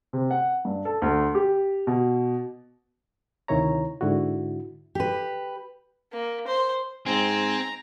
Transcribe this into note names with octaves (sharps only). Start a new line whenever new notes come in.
C3
F#5
G2
A4
D2
G4
B2
D2 C3 D#3 E4 C#5 A#5
G#2 D3 E4 F#4
G4 B4
A#3
C5
G#2 C4 G#5 A#5